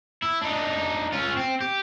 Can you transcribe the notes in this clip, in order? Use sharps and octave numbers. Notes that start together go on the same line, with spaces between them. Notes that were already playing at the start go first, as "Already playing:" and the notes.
E4
D4 D#4
C#4 F4
C4
G4